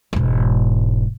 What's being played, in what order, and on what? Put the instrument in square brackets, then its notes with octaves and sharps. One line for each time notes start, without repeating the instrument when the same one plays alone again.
[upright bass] E1 G#2